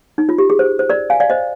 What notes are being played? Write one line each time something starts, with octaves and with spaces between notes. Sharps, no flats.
D#4
F4
G4
G#4
C5
C5
A#4 D5
F5 G#5
D5 F5
C5 D#5